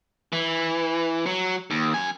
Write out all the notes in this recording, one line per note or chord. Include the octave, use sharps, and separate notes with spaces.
E3
F#3
D#2
F#2 G#5